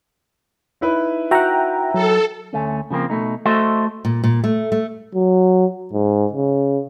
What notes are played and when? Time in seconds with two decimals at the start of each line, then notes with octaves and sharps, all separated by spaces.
0.81 D#4 E4 B4
1.31 F#4 E5 F#5 G5 A#5
1.94 F#3 A4
2.53 D2 A3 C#4
2.91 C#3 F3 A3 A#3 C4
3.10 B2 A3 D#4
3.46 A3 F#4 A4 C5 D#5 E5
4.05 A#2
4.24 A#2
4.44 A3
4.72 A3
5.15 F#3
5.93 G#2
6.33 C#3